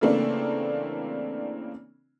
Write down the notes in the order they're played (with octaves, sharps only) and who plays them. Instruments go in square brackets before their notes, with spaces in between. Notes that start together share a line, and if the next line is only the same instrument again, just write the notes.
[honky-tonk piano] C#3 E3 A3 A#3 C4 D4